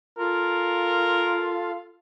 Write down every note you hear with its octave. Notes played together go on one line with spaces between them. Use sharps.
F4 A4 A#4 F5